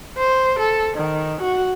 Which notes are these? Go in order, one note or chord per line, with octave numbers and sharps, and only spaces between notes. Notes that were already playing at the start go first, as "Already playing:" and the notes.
C5
A4
D#3
F#4